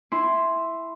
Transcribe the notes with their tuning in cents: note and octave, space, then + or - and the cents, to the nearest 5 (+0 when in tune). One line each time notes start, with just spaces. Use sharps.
E4 +0 G#5 +0 C6 +0